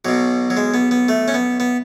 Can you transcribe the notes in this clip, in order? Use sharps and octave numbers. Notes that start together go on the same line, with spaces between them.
B1 B2 F#3
F#3
G#3
B3
B3
A3
C#4
B3
B3